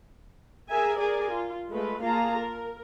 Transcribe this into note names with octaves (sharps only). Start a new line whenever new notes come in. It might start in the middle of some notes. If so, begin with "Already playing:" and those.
G#4 A#4 E5 G#5
G#4 A#4 D5 G#5
F4
G#3 A3 F4 B4
A#3 F4 G#4 F5 A5 A#5
A#4